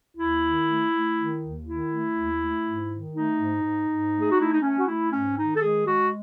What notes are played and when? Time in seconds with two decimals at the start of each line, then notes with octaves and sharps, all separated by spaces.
0.17 D#2 E4
0.43 D#3
0.67 A3
0.91 A3
1.16 D#3
1.42 D#2
1.66 D#3 E4
1.90 A3
2.15 D#2
2.40 A3
2.65 G#2
2.89 D#3
3.13 A3 D#4
3.39 G#2
3.63 G#2
3.88 G#2
4.13 A3
4.20 G#4
4.30 F#4
4.37 A3 E4
4.52 D#4
4.61 A3 C#4
4.78 F#4
4.86 A3 E4
5.11 G#2 C#4
5.36 D#3 D#4
5.54 A4
5.60 G#3 G#4
5.86 G#3 F#4